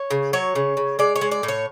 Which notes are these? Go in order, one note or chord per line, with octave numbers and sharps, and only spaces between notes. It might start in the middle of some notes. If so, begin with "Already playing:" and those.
Already playing: C#5
C#3
F#3 C#5
C#3
C#3
G#3 D5
C#5
G#3
D5
A2
C#5